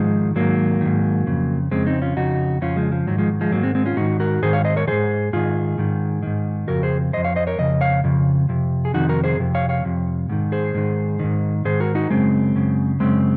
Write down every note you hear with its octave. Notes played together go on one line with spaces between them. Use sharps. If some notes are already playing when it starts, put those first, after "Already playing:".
Already playing: G#2 D#3 F3 G#3
G#2 D#3 F#3 A#3
G#2 D#3
F2 C#3
F2 C#3 G#3 C4
C4 D#4
C#4 F4
F2 C#3 D#4 F#4
F2 C#3 C#4 F4
F3 G#3
F3
G#2 D#3 F#3
F3 G#3
F3 G#3
G#2 D#3 F#3 A#3
G#3 C4
G#3 C4
C#4 F4
G#2 D#3 D#4 F#4
F#4 A#4
G#2 D#3 G#4 C5
C#5 F5
C5 D#5
A#4 C#5
G#2 D#3 G#4 C5
G#2 D#3 F4 G#4
G#2 D#3
G#2 D#3
F2 C#3 F#4 A#4
G#4 C5
F2 C#3 C5 D#5
C#5 F5
C5 D#5
A#4 C#5
F2 C#3 D#5
C#5 F5
F2 C#3
F2 C3
G#4
F2 C3 D#3 D#4 F#4
F#4 A#4
G#4 C5
F2 C3
C#5 F5
C#5 F5
F2 C3
G#2 D#3
G#4 C5
G#2 D#3
G#2 D#3
G#2 D#3 G#4 C5
F#4 A#4
D#4 F#4
F#2 C#3 G#3 C4
F#2 C#3
F#2 C#3 G#3 C4